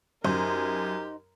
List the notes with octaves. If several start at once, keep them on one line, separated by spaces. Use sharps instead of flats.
F#2 D#4 G4 A#4 C5